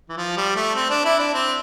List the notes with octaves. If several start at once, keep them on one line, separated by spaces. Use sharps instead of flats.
E3
F3
G3
A3
C4
D4
E4
D4
C4